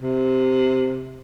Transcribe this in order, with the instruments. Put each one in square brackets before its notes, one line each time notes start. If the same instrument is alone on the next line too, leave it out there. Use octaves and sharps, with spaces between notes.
[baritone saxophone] C3